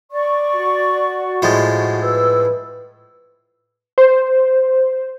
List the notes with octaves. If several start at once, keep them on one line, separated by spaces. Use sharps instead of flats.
D5 C#6
F#4
A2 F3 G#3
B4 E6
C5